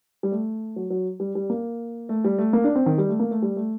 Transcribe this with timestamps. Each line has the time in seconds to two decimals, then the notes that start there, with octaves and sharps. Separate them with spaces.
0.23 G3
0.32 A3
0.76 F#3
0.90 F#3
1.20 G3
1.35 G3
1.50 A#3
2.09 A3
2.24 G3
2.38 A3
2.53 A#3
2.64 D4
2.75 C4
2.86 D#3
2.98 G3
3.09 A3
3.19 A#3
3.31 A3
3.42 G3
3.56 A3